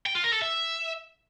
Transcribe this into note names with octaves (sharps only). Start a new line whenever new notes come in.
G5
F4
A#4
A4
E5